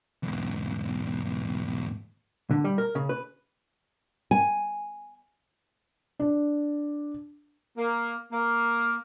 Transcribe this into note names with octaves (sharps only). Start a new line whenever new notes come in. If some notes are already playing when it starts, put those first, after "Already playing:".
E2 G#2
D3
G3
A#4
C#3
B4
G#5
D4
A#3
A#3